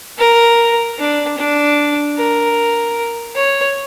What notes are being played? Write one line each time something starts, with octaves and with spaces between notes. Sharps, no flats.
A#4
D4
D4
A#4
C#5